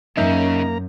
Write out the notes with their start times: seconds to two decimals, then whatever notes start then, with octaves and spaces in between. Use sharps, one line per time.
0.17 F#2 C#3 A#3 C#4 D#4 E5 A#5 G6